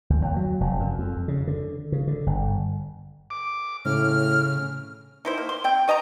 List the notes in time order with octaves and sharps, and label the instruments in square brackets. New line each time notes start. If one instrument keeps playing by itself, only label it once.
[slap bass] D2
D#2
F#3
F1
F#2
F2
C#3
D3
C#3
D3
G1
[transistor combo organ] D6
[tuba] A2 [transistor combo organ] C#3 [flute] F6
[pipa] D#4 E4 C5
A#3
C6
C4 G5
C#5 D#5 A5 A#5